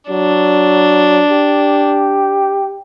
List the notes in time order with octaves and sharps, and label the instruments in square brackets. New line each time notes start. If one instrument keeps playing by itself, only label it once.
[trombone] F#3 [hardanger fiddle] D4
[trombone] G4